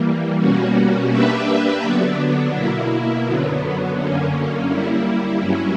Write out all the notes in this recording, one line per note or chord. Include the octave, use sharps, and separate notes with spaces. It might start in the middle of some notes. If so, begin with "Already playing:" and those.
Already playing: E3 G3 A#3
B2 G3 A#3 C#4 F#4
A#3 D4 G4 B4 E5
D3 F#3 B3 D4
B2 A#3 E4
F#2 D3 F#3 B3
F#2 D3 A#3 C#4
G3 A#3 E4
G2 F#3 C#4 E4